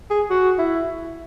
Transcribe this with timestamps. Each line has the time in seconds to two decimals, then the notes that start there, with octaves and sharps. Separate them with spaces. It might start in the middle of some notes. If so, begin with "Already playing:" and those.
0.10 G#4
0.30 F#4
0.59 E4